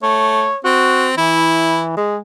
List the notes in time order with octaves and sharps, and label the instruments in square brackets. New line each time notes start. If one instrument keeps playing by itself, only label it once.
[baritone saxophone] A3 [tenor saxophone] C#5
[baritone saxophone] C4 [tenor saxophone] F#4
[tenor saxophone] E3 [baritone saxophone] E4
[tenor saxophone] G#3